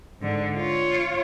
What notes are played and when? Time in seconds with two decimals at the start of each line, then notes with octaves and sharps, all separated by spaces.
0.21 G#2 D3
0.57 F4 C#5